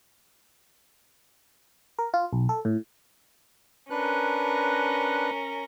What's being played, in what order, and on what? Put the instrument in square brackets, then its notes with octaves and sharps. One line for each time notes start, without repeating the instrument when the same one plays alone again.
[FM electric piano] A#4
F4
B1
A4
A2
[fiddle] C#4 A#4 [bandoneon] D4 B4 F#6